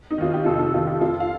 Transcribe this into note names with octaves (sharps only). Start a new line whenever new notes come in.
D#4
D#2 D#3 F4
G4
F1 F4 A4
F4 A4
D#2 D#3 F4
D#4 G4
F2 F4 A4
F5